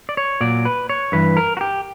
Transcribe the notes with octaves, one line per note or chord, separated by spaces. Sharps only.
D5
C#5
A#2 F#3 D5
B4
C#5
G2 E3 B4
A#4
F#4
G4